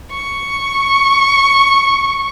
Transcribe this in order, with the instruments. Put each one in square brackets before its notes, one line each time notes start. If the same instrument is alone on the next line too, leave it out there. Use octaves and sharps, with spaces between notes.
[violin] C#6